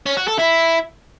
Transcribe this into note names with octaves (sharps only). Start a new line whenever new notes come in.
C#4
F#4
A4
E4